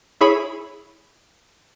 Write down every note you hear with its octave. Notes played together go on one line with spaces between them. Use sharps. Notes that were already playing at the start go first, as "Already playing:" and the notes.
E4 G#4 C#5 B5